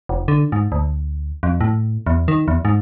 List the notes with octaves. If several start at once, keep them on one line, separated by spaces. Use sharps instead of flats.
F1
D3
G#2
D2
F2
A2
E2
D#3
E2
G#2